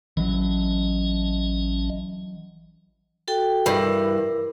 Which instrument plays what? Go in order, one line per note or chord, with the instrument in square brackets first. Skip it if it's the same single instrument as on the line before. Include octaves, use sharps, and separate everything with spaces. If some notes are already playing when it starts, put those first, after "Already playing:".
[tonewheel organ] A1 C#4 D#5 [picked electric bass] E3 F#3
[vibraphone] F#4 A4 G5
[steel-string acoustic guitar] G2 E3 [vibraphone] A#4